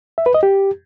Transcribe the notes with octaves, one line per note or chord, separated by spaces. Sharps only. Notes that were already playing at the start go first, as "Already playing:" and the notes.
E5
B4
D#5
G4